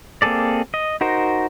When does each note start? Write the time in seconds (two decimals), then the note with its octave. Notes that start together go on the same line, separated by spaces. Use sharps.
0.22 A#3 C4 G#4 A4 D5
0.74 D#5
1.01 D#4 F#4 A#4 C5